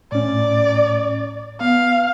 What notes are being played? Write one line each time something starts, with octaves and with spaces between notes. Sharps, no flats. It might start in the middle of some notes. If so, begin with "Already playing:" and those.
A2 C#4 D5
B3 F5